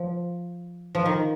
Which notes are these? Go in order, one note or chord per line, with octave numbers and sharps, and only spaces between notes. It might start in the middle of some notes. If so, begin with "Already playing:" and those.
Already playing: F3
F3
D#3